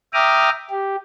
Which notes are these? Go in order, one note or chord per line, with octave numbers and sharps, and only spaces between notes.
E5 G5 A#5 D6 D#6 F6
G4